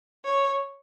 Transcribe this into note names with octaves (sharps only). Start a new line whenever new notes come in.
C#5